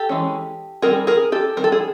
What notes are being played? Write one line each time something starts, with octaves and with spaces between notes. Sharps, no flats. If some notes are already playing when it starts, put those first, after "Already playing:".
Already playing: G4 A4
E3 G#3 C#4
D#3 G3 C4 G#4 A#4
G#4 A#4
G4 A4
D#3 G3 C4 A#4
A4
G#4